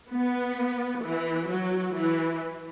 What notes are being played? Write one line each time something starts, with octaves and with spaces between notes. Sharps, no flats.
B3
E3
F#3
E3